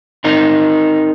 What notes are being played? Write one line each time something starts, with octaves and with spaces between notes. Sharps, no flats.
C4 D#4 A#4